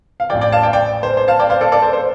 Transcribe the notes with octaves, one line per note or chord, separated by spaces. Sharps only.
F5
A1 A2 F3 D5 G5
D5 G5
F5 A5
D5 G5
D5 G5
C5
C5
F5 A5
D5 G5
C5 F5
A4 D5
A4 D5
C5
C5